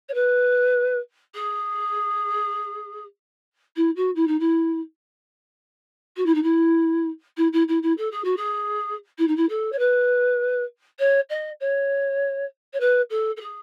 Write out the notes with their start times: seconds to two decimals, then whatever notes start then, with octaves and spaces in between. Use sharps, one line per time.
0.09 C#5
0.14 B4
1.35 G#4
3.76 E4
3.96 F#4
4.15 E4
4.27 D#4
4.40 E4
6.16 F#4
6.26 E4
6.34 D#4
6.43 E4
7.37 E4
7.53 E4
7.68 E4
7.82 E4
7.97 A4
8.11 G#4
8.24 F#4
8.37 G#4
9.18 E4
9.27 D#4
9.36 E4
9.49 A4
9.72 C#5
9.78 B4
10.99 C#5
11.29 D#5
11.60 C#5
12.73 C#5
12.80 B4
13.10 A4
13.36 A4
13.41 G#4